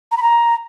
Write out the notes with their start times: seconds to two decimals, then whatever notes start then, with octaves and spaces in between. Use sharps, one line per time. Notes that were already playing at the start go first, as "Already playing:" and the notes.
0.12 A#5
0.17 B5
0.22 A#5